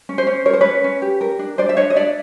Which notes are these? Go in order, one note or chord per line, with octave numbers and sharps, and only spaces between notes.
C#4
C5
C#4
A#4 C#5
C5
C#4 B4 C#5
C#4
G4
A#4
D4
D4 C5 D5
E5
D4 C#5 D#5
D#5
D4 D5 E5